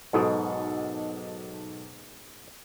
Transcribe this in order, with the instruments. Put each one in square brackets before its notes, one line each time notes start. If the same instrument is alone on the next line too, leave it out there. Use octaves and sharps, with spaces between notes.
[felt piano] B1 A4 D#6 [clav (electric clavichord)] G#2 B2